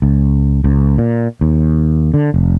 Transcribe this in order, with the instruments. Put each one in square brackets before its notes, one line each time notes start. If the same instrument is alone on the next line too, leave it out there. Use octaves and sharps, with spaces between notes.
[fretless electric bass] C#2
C#2
A#2
D#2
D3
F1